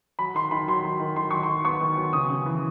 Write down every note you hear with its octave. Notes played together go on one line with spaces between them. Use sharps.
F#3 B5
D#3 C6
D#3 B5
F#3 C6
F#3
D#3
D#3 C6
F#3 C#6
C6
D#3
B3 C#6
D#3
F#3
C#3 D#6
C#3
E3